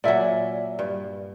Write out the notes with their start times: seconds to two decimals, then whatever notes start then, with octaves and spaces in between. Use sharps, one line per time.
0.04 A#2 F#3 D5 E5 G#5
0.79 G2